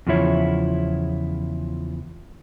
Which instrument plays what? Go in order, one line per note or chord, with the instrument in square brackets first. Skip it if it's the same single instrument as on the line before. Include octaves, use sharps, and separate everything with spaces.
[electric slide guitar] E2 C#3 F3 E4 C#5